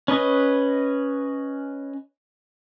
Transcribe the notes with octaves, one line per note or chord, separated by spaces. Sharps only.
C#4 B4 D#5